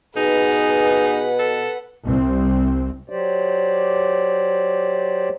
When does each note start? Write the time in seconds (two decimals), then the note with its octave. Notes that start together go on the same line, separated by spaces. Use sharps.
0.16 B2 D#4 G#4 B4 F#5
1.39 A4
2.04 C2 C4
3.10 F#3 G4 C5 D5